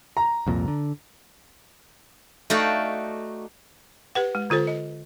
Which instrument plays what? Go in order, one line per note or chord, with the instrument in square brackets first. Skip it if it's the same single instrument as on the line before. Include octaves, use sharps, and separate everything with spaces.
[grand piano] A#5
[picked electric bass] C2 F2 A#2
D3
[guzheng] A3 D#4 F#4 D5 F5 G5
[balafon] G4 B4 F#5
G#3
D3 F4 A4 C5
D#5